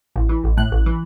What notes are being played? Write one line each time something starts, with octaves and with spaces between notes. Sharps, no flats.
A1
E3
A1
A2 F#6
A1
E3